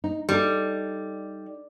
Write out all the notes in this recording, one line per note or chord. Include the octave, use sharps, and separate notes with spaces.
D#4
G3 D#4 A4